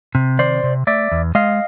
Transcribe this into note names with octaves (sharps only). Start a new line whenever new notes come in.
C3
D#3 C5 D5
C3
A3 D5 E5
E2
G#3 D#5 F5